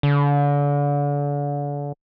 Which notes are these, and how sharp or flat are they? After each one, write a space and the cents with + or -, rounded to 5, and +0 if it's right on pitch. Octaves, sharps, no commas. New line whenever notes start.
D3 -35